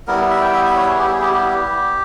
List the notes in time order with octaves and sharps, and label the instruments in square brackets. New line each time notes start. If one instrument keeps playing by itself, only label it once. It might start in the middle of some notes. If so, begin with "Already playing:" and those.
[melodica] G3 B3 E4 A#4
E5
G5
E5
E5
C#5
G#4
G4
G#4
G4
G4